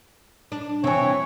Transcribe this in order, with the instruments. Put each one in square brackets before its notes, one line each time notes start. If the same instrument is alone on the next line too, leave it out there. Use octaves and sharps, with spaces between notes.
[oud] D4
[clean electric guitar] C3 G#5 [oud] E3 C4 [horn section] C#5